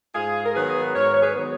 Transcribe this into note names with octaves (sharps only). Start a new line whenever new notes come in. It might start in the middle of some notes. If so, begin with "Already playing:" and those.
G#2 F4 G#4
A#4
D#3 F#3 B3 G#4 B4
G#2 A#4 C#5
C#5
G#4 B4
D#3 F#3 B3